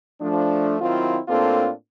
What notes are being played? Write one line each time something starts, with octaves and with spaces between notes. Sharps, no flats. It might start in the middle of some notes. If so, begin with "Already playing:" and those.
F3 A3 D4
D#3 F#3 C4 E4 F4
A2 A#3 C4 D4 F4 A4